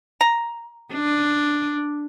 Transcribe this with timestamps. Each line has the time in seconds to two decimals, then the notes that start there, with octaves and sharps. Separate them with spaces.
0.21 A#5
0.93 D4